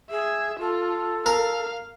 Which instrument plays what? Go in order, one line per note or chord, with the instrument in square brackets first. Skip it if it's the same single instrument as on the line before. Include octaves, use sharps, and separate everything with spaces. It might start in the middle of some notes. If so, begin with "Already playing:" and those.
[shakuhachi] G#4 [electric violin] E5
[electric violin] F4 [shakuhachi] A4
[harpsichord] A#4 [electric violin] F5